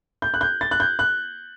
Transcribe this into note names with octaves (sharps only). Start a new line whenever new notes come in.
G6
F#6
G6
A6
F#6
G6
F#6